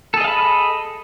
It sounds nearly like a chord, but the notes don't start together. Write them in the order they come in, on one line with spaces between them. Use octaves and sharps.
A4 G#4 D#5 F5 B5